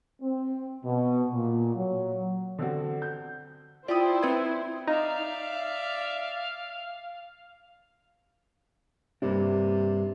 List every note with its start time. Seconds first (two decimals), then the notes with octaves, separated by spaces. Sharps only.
0.22 C4
0.85 B2
1.34 A#2
1.75 F#3
2.59 D3 C4 F#4
3.02 G6
3.88 E4 F4 G4 C5 D5 G5 D#6
4.22 C4 D4 D#4 B4 G#6
4.88 D#4 D5 E5 F5
9.22 G2 C3 A#3 D4